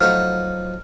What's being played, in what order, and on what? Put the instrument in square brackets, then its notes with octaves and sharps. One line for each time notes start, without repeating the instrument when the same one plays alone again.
[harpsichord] F3 D#4 B4 [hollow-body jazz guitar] F#3 A3 F#4 [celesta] F6